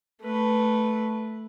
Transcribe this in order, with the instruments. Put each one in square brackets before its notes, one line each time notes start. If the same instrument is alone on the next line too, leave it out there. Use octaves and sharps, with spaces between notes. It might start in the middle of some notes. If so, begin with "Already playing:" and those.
[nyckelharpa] A3 B4